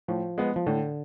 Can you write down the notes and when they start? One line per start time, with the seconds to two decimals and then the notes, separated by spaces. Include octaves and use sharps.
0.08 A2 F3
0.38 G#3 B3
0.56 F3
0.66 A2 D3